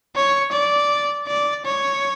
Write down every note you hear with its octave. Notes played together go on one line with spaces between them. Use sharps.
C#5
D5
D5
C#5